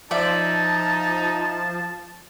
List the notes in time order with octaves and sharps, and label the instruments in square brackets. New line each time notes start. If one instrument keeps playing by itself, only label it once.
[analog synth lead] F3 [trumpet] D#4 [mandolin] D5 E5 [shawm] A5